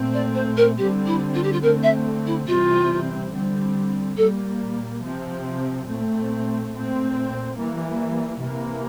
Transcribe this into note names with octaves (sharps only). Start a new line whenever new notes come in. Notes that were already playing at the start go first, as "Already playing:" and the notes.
Already playing: A#2 A3 C4
D5
C5
A#4
D3 G3 C4 G4
E4
F4
G4
F4
D3 A3 C4 A#4
E5
E4
C3 E3 G3 C4 F4
D3 G3 C4
A#2 G3 A#3 A4
C3 F3 C4
A#2 A3 C4
A#2 A3 C4
E3 G3 A#3
C3 E3 A#3